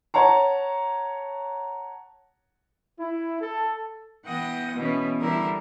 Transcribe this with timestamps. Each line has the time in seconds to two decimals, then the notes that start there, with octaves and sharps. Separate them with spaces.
0.14 C#5 F#5 A5 A#5
2.99 E4
3.41 A4
4.25 E3 B3 F#5 G5 D#6 A#6
4.76 B2 E3 B3 C#4
5.20 D3 E3 G3 E4 A#4